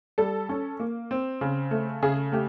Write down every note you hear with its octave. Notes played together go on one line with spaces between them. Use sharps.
G3 A4
C#4
A#3
C4
C#3
A3
C#3 G#4
A3 G4